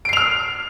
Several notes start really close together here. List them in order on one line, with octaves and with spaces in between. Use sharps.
D7 C7 F7 F6